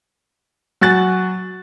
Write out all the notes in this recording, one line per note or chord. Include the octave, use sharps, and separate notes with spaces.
F#3 F#4 G#5 F#6 A6